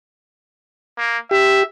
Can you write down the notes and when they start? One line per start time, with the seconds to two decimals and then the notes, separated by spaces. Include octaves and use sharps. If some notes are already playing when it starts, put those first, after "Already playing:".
0.98 A#3
1.31 G4 E5